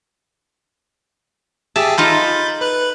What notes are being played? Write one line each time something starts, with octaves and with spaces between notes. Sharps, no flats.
G4 G#4 E5 A5
D#4 F4 A4 B5 G6 A6
B4 F#6